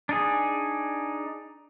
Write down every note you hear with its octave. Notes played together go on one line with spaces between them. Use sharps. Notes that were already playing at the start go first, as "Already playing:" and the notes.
D4 D#4 G#4